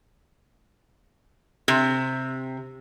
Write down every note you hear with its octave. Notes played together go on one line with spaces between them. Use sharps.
C3